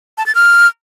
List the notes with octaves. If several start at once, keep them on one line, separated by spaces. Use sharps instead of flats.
A5
A6
F6